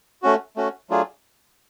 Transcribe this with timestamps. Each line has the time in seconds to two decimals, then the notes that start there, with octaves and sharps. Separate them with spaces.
0.22 A3 C#4 F#4
0.56 A3 C#4 F#4
0.90 F#3 A3 D4 F4 G#4